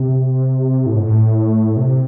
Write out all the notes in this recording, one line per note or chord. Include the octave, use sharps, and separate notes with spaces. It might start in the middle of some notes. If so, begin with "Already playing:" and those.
Already playing: C3
A2
G#2
A2
C3